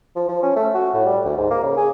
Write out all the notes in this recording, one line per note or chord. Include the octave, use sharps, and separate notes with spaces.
F3
F3
C#4
A3
F#4
A2
G3
D2
G#2
A#3
C#3
G#4